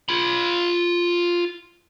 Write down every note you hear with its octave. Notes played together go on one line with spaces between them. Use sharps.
F4 B5